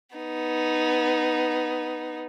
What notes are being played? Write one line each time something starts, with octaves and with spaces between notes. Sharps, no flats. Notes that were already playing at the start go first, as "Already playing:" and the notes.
B3 D#4